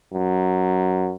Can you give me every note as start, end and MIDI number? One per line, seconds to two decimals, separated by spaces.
0.13 1.14 42